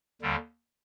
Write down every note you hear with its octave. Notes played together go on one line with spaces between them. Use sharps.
D#2 D3 G3